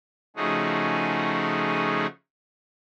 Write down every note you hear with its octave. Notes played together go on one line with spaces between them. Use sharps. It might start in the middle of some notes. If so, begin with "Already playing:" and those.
C#3 F3 A3 D#4 F#4 G#4